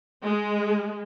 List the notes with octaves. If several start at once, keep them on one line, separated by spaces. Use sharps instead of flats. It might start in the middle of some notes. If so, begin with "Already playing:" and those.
G#3